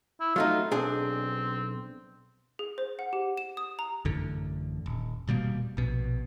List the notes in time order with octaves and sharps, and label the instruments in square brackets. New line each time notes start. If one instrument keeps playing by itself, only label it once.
[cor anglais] E4
[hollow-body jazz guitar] F#3 A3 D#4 [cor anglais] F4
[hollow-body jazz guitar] B1 D4 G#4 [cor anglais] C4
[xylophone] G#4
C5
F#5
G4
E7
D#6
A#5
[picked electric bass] A1 F#2 D3
D#1
D#1 B2 G3 A#3
A#1 B2